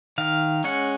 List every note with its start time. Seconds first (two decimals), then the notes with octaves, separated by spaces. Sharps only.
0.18 D#3 F5
0.64 G#3 C#4 F#5